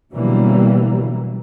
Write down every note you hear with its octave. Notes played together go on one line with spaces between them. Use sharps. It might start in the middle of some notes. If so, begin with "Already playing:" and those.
B2 D3 E3 F#3 G3 A#3